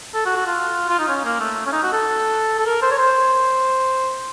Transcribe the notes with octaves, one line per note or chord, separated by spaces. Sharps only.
A4
F#4
F#4
F4
F4
D#4
C#4
A#3
A3
C#4
D#4
F#4
A4
A4
A#4
C5
C#5
C5